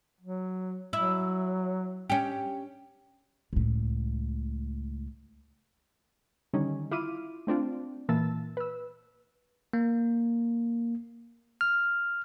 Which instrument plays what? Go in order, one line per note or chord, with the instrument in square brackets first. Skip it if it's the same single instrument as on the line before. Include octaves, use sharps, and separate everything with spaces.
[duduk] F#3
[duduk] F#3 [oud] E4
[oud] C#4 G4
[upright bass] C#2 A2
[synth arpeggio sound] D3 D#3 G3 C#4 D#4
E4 F4 D6 F6 D#7
A3 C4 D4 F4
A#2 E3 A#3 A5 E6 A6
B4 E6
[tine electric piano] A#3
F6